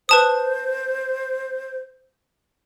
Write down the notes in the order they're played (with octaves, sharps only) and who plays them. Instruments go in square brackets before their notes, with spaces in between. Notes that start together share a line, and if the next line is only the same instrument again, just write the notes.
[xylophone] B4 A5 D#6 [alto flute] C5